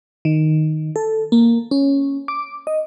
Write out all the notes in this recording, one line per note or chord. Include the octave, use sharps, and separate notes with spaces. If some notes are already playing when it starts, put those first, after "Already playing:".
D#3
A4
A#3
C#4
D6
D#5